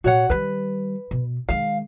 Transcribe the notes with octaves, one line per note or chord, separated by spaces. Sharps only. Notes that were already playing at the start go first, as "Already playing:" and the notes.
A#2 F#4 C#5 F#5
D#3 G3 B4
B2
D#3 G#3 F5